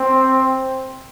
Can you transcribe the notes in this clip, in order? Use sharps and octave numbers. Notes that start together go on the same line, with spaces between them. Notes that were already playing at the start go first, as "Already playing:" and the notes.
Already playing: C4